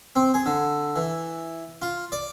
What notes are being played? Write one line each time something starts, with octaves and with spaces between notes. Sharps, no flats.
C4
G#4
D3
E3
F4
D5